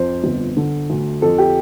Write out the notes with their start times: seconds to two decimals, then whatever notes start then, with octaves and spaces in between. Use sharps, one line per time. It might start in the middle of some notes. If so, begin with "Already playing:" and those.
Already playing: F2 C5
0.24 G1
0.57 D3
0.90 D2
1.22 F2 A4
1.38 G4